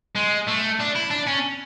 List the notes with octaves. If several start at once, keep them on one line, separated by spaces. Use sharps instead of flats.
G#3
A3
D4
E4
D4
C#4